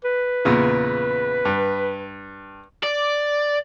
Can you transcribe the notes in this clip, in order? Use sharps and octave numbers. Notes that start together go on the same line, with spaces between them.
B4
E2 A#2 C#3
G2
D5